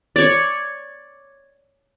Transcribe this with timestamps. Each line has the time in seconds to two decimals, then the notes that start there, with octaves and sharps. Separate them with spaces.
0.16 C#5 D5